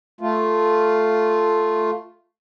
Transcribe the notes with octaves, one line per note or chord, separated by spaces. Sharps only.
A3 F4